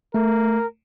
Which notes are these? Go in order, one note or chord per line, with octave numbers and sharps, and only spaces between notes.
A3 A#4